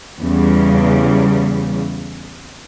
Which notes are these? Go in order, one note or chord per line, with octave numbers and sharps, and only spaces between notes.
E2 C#3 G3